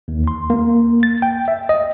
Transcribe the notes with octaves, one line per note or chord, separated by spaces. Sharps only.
D#2
C6
A#3
A6
G5
E5
D#5